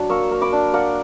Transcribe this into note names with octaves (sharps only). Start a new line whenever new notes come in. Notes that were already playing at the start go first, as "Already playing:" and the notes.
Already playing: F#3 D4
A#3 C#6 E6
A#3
B5 D6
D4
A#3 D5 F#5